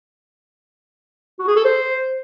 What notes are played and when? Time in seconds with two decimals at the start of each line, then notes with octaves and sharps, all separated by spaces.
1.39 F#4
1.48 G#4
1.56 A4
1.65 C5